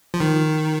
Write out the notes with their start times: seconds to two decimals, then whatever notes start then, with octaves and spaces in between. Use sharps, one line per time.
0.14 F3
0.20 D#3